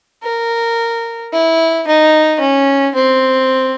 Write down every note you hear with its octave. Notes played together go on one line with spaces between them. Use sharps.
A#4
E4
D#4
C#4
C4